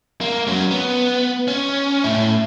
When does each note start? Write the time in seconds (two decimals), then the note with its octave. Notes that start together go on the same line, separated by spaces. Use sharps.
0.21 A#3
0.47 F#3 C#4
0.71 B3
1.48 C#4
2.04 A2 E4